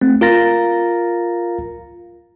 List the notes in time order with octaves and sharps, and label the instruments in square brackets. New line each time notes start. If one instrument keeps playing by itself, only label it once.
[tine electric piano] A3 C4
F4 A#4 F5 A#5 A6 A#6